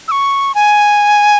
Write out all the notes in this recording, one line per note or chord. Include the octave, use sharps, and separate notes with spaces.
E6
C#6
G#5